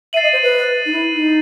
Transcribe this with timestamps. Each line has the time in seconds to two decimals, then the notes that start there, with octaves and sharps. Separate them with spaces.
0.13 E5 A6 C7 D#7 F#7
0.23 D#5
0.33 C5
0.43 B4
0.86 D#4
0.92 E4
1.11 D#4